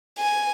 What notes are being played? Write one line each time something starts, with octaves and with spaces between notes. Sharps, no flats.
G#5